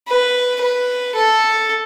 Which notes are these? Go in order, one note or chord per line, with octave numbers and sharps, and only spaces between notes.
B4
B4
A4